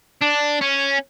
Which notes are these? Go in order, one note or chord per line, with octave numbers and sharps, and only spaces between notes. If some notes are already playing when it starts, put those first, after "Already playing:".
D4
C#4